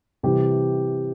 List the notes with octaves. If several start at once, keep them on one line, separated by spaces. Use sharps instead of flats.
C3 E3 G3 G4